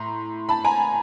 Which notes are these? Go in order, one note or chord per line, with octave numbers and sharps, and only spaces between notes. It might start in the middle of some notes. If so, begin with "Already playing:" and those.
Already playing: A2 A#5 C6
A5 B5
G#5 A#5